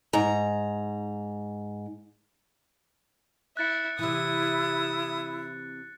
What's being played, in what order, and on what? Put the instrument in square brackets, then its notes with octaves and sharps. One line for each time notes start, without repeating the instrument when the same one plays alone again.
[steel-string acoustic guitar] G#2 A#5
[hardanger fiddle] E4 [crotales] F#6 A6 C#7
[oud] C3 E3 [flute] E4 [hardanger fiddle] D#6